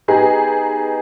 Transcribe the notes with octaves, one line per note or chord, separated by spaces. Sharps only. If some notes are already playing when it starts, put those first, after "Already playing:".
B3 D#4 G4 G#4 A#5